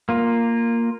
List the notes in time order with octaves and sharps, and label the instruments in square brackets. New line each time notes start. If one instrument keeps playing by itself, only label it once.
[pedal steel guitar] A#3 F4